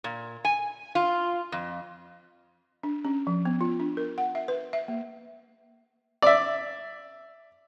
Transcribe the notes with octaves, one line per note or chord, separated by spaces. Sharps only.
A#2
G#5
F4
F2
D4
C#4
F3
B3
F4
D4
A#4
F#5
E5
B4
E5
A#3
D5 E5